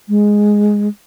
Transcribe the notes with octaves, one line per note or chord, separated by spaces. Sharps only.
G#3